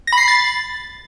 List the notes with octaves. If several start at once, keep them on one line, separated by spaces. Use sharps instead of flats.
A#6
B5
C7
B5
A6